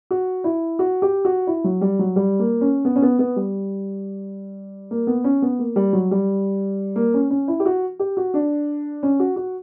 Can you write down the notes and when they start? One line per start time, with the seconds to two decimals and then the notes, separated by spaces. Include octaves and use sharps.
0.11 F#4
0.44 E4
0.79 F#4
1.02 G4
1.25 F#4
1.47 E4
1.64 F#3
1.81 G3
1.99 F#3
2.16 G3
2.39 A#3
2.61 C#4
2.85 B3
2.96 C#4
3.02 B3
3.19 B3
3.36 G3
4.91 A#3
5.07 B3
5.24 C#4
5.42 B3
5.59 A#3
5.76 G3
5.93 F#3
6.11 G3
6.96 A#3
7.14 C#4
7.30 C#4
7.48 E4
7.60 G4
7.66 F#4
7.99 G4
8.17 F#4
8.34 D4
9.03 C#4
9.20 F#4
9.36 F#4